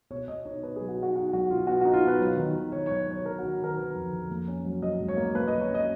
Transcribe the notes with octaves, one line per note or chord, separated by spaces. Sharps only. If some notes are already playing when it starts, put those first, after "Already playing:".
B2 C#5
B2 D#5
D#4 C#5
B2 B4
G#4
F#3
F#4
D#4
F#4
D#4 F#4
F#3 F#4
B2 F4
B3 F#4
F#4
D#4
F4
B2 B4
F#3
D#3
F#3
D#3 C#5
C#5
F#3
F#3 C#5
B3 A#4
F#4
D#3
D#3 A#4
D#3 B4
F2
F2
A#3
C#4
F#3
F#3 D#5
G#2
C#5
A#3
A#3 B4
D#5
F#3
C#5
C#4 D#5